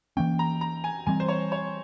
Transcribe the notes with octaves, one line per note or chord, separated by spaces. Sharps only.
E3 A#3 C#4 G5
A#5
A#5
G#5
E3 G3 C4 G#5
C5
C#5
C#5